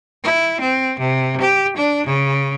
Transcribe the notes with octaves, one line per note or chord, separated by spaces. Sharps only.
E4
C4
C3
G4
D4
C#3